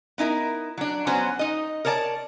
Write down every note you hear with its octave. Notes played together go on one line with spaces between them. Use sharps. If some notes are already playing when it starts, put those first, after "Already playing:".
B3 D#4 E4 A#4
F#3 D4
F#3 B3 C#4 F#4 C5
D#4 D#5
A#4 C#5 D5 A5